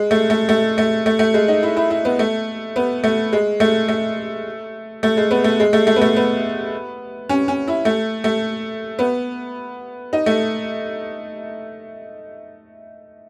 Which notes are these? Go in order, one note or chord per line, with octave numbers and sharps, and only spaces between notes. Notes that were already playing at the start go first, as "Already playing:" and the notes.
Already playing: G#3
A3
A3
A3
A3
A3
A3
G#3
D#4
E4
E4
E4
B3
A3
B3
A3
G#3
A3
A3
A3
G#3
B3
A3
G#3
A3
A3
B3
A3
B3
C#4
C#4
E4
A3
A3
B3
D#4
A3